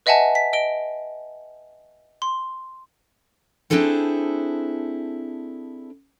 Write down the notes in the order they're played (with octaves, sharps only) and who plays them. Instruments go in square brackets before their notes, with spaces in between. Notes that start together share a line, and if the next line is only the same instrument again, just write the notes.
[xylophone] B4 D#5 E5 F#5 G#5 A5
B6
D#5 D7 G7
C6
[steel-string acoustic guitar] C4 D4 E4 G#4 A4 C5